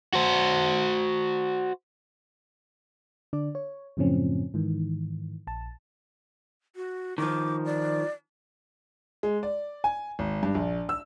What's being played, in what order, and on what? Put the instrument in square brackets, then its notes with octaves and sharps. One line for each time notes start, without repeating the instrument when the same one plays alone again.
[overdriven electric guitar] F#4 C5
[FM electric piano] D3 D4 D5
C#5
F#2 A2 C#3 F3 C4 C#4
G#2 D#3 E3
A#1 A5
[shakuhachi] F#4
[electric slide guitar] D#3 F3 [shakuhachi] D6
[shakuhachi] D5
[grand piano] G#3
D5
G#5
G#1
G2
A#1
E6